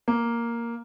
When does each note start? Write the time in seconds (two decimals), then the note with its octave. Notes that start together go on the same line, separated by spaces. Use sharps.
0.08 A#3